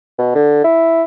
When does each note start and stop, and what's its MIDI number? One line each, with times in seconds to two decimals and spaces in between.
0.19 0.33 47
0.35 0.64 50
0.64 1.04 64